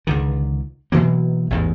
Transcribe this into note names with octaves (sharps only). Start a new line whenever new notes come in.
C#2 D3 D#3
B2 E3 F#3 A#3
A1 E2 G#2